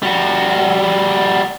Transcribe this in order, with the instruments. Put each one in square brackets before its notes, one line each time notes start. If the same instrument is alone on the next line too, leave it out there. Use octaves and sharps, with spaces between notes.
[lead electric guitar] G3 F#4